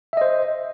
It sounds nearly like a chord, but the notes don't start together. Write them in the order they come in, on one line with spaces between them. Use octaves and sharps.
E5 D#5 C5